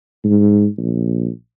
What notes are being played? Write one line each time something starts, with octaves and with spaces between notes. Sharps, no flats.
G#2
A#1